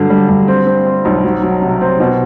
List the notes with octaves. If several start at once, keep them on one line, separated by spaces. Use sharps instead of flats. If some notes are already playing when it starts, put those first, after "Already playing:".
Already playing: G2 D3 F#3
G3
G2
C4
C4
C4
B1
F#3
F#3
C3
C4
B2